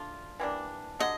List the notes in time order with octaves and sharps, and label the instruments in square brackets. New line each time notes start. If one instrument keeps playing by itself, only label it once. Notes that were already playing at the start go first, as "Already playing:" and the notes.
Already playing: [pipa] A3 D4 F4
E3 G3 A#3 D4
[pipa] D3 F#3 [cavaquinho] D#5